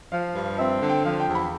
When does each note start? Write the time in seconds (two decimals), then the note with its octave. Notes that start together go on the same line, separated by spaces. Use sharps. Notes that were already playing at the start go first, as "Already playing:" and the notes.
0.12 F3 F5
0.35 G2
0.58 C4 E5
0.81 D3
0.89 G5
1.05 F3 F5
1.20 G5
1.28 E2
1.35 B5